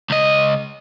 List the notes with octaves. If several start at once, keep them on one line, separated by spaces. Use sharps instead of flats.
C#2 D#5